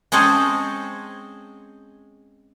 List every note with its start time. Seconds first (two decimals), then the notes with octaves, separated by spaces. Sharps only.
0.12 G#3 C4 C#4 G#4 A4 C5